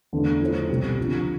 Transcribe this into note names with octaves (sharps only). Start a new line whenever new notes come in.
E2 D3 A3
F3 A3 E4 A4 C5
C2 B2 G3 C4 G4
F2 D3 F3